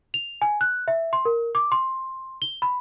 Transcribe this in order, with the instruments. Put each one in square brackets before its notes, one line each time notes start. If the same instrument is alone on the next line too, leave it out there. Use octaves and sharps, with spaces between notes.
[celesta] F7
G#5
F#6
E5
C6
A#4
D6
C6
G7
B5